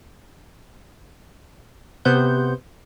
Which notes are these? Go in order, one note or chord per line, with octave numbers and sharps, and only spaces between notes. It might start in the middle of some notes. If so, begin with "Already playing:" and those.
C3 B3 C5 F#5 G6